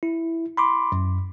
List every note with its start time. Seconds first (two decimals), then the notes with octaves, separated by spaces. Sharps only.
0.03 E4
0.57 B5 C6 D6
0.92 F#2